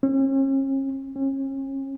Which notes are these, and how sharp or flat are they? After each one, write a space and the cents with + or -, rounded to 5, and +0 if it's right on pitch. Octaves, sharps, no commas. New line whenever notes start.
C#4 -40
C#4 -35